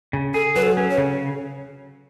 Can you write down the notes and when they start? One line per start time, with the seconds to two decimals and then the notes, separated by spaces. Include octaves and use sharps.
0.13 C#3
0.34 G#4 A4
0.56 F#3 B4
0.62 A4
0.77 C#4
0.91 C#5
0.98 C#3